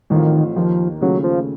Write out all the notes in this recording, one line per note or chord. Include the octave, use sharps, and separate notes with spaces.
A1 A2 D#3 F3 C4 F4
D#2 D#3 F3 A#3
D#2 C#3 F#3 A3 C#4 F4
F3